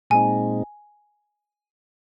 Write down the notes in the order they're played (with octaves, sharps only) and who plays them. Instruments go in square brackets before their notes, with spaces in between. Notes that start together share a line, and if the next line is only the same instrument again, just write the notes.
[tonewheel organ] A#2 G#3 C4 D#4 [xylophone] G#5